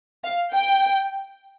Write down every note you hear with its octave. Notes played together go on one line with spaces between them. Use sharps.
F5
G5